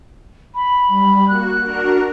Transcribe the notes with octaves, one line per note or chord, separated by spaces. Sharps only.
B5
G3
A#3 F#4 F#6
D4 F#4 A#4